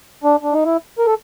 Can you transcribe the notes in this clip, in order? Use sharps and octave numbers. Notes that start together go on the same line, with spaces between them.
D4
D4
D#4
E4
A#4
A4